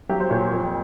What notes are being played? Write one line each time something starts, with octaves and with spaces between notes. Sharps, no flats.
F#3 G4
C5
A#2 C#5
F2